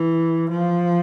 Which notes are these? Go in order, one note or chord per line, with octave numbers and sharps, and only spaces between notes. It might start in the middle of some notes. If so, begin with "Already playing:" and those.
Already playing: E3
F3